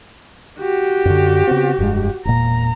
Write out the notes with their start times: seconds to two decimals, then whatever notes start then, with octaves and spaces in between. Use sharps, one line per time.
0.59 F#4 G4
1.05 F#2 D3
1.47 C#3 B3 C4
1.78 F1 G2 G#3
2.25 E1 A#2 A#5